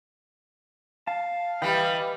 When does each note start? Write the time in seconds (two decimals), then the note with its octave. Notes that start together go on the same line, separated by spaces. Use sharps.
1.07 F5 A5
1.62 E3 G3 B4 D#5 G5